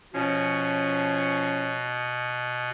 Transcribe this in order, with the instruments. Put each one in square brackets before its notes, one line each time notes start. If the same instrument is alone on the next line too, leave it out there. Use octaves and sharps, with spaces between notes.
[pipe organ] B2 [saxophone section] F3 C#4